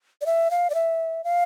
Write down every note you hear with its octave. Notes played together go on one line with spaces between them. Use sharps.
D5
E5
F5
D5
E5
F5